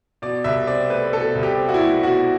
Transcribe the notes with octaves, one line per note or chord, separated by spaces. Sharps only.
B2 D5
C2 E5
C4 D5
A3 B4
B2 A4
C2
G4
C4
F#4
E4
A3
B2 F#4